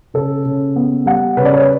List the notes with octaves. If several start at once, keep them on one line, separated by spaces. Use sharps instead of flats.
C#3 A4
C#3
B3
G3 F#5
C#3 B4
D5
C#5
B4